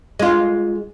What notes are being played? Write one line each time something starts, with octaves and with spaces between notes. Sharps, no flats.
G#3 F4